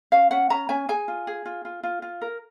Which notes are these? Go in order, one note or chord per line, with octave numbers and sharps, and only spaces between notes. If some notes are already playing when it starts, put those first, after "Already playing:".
C#4 F5
C#4 F#5
C#4 A#5
C#4 G#5
G#4 G#5
F4
G#4
F4
F4
F4
F4
A#4